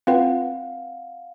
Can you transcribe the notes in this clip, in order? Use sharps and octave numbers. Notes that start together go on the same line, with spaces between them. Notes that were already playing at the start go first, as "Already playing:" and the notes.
C4 F4 B4 F5 F#5